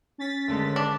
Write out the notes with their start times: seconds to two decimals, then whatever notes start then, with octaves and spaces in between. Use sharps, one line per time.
0.18 C#4 A6 B6
0.48 G#1 D3 G#3
0.76 D4